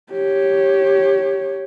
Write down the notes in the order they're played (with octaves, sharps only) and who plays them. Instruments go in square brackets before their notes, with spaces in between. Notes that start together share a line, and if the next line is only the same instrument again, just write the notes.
[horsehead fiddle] G4 C#5